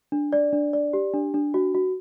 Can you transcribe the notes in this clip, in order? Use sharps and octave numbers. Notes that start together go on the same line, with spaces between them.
D4
D5
D4
D5
G4
D4
D4
F#4
F#4